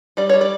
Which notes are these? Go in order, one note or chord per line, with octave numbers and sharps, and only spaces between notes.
G3 D5
G3 C#5
D5